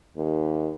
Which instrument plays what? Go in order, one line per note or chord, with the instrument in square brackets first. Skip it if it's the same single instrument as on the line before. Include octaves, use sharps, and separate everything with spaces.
[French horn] D#2